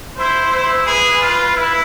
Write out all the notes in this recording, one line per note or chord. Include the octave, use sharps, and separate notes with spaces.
E4 C5
E4
E4 G#4 B4
F4
E4